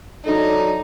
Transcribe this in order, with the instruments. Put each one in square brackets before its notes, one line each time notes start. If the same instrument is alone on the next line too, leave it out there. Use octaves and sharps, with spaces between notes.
[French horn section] F#3 A4 D5 [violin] D#4